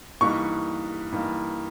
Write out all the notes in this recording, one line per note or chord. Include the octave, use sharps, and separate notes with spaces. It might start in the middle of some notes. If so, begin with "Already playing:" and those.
G2 E3 A#3 D#4 C#6
G2 E3 A#3 D#4